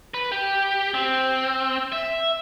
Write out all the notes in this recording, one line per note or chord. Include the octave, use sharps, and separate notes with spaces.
B4
G4
C4
E5